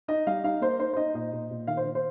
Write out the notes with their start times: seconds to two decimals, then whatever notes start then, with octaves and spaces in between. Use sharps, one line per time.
0.08 D#4 D#5
0.27 G3 F5
0.44 D#4 F5
0.61 A#3 C5
0.79 D#4 C5
0.93 C5
0.97 D#4 D#5
1.14 A#2 D#5
1.33 A#2
1.51 A#2
1.67 D#3 F5
1.77 C5
1.85 D#3
1.95 C5